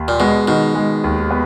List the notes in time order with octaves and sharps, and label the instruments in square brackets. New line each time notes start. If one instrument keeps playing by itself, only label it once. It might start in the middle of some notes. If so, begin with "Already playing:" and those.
Already playing: [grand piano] D#2
[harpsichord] A#2
[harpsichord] B2 [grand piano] G#3
[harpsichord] B2 [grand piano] D#3
[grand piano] G#3
D#2
B3